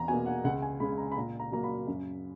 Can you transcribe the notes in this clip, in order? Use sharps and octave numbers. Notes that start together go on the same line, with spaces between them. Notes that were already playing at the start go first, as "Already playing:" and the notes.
Already playing: E2 A#5
B2 A#3 G#5
F#5
C#2 F#5
G#5
C#3 G#3 B5
A#5
B5
A#2 A#5
A#5
F#3 A#3 A#5
B5
F#2